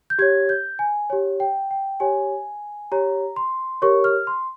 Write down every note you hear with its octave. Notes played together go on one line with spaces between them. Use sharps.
G6
G4 C#5 G#6
G6
G#5
G4 C#5
G5
G5
G4 C#5 G#5
G4 C#5 A#5
C6
G4 A#4 C#5 C#6
F6
C6